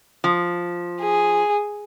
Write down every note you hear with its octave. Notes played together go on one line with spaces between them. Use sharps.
F3
G#4